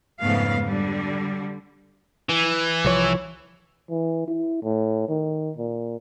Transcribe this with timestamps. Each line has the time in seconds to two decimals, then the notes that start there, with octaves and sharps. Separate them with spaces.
0.21 F2 G#2 C#3 A3 B3 F5
0.63 D3 G3
2.29 E3
2.85 C2 F3 C#5
3.90 E3
4.28 E4
4.63 A2
5.09 D#3
5.57 A#2